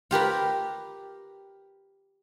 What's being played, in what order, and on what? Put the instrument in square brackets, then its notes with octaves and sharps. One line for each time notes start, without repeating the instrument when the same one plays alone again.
[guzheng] F4 G4 A#4 B4